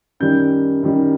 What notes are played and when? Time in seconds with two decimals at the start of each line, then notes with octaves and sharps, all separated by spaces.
0.20 F#2 D#3 G3 G6
0.82 F#2 D#3 G3